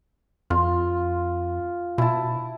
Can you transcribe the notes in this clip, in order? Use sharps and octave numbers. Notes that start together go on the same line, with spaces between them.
F2 F4
B2 E4 A5